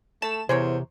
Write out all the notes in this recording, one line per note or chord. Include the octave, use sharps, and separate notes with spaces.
A3 A5 E7
E2 C3 G#4 A#4 C5 C#5